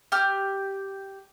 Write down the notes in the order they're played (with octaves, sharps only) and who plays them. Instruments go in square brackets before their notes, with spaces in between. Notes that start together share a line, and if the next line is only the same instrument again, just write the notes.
[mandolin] G4 F6